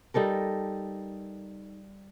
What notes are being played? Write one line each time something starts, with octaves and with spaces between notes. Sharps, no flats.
G3 D#4 A4 A#4